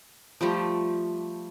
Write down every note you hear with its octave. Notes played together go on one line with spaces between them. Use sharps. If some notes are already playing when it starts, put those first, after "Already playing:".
F3 G3 A3 G4